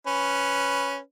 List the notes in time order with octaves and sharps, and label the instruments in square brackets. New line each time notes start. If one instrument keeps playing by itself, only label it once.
[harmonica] C#4 B4